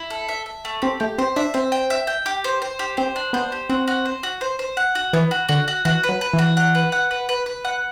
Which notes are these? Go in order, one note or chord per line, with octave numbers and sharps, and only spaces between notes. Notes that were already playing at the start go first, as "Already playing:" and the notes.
Already playing: E4
A4
E5
E5
A3
C4 G4
A3 G4
C4 C5
D4 E5
C4 C5
G5
E5
G5
G4
C5
C5
G4
C4 C5
D4
B3 C5
G4
C4 F#4
F#4
C5
F#4
C5
C5
F#5
F#4
E3 B3
F#4
D3 F#4
F#4
E3 F#4
B4
F#3
B4
E3
F#4
F#5
B4
F#5
B4
B4
B4
F#5